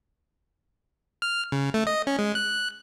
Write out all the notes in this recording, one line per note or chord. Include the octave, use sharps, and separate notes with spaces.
F6
C#3
A3
D#5
C#4
G#3
F#6